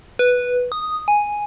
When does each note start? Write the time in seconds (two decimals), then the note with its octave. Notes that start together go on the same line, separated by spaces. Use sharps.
0.19 B4
0.72 D#6
1.08 G#5